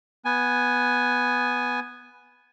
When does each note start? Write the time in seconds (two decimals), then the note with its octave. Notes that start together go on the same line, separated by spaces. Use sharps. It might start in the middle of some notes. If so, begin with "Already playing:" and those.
0.25 B3 G#5